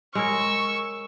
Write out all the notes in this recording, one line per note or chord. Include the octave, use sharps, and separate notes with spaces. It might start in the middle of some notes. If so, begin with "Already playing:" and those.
G#3 A#4 C#5 C#6 E6